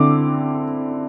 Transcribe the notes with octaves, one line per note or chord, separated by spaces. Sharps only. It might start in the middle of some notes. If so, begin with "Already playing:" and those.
Already playing: D3 C4 E4 D6